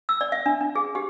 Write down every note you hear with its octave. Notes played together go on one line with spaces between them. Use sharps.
E6
D5
E5
D4
D4
G#4
G4